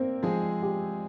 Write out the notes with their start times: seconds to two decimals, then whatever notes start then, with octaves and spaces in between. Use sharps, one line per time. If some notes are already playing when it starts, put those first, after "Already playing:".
Already playing: A#3 C4 A#4
0.23 F3 G#3 G#4
0.62 G4